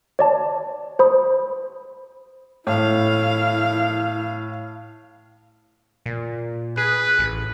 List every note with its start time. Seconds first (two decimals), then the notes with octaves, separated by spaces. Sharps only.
0.19 C#5 D5 A5
0.99 C5 B5 D#6
2.67 A2 E4 F5
6.06 A#2
6.77 G#4 B4
7.19 A1